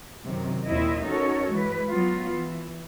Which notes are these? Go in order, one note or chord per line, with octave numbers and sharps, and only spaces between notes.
F#2 C3 D#3
D#2 A#2 C4 E4 D#5 E5
C#4 D#4 F#4 A4 A#4 C#5
E3 G#3 B4
F#3 B3 F4
E3